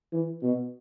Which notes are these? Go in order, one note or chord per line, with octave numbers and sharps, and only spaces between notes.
E3
B2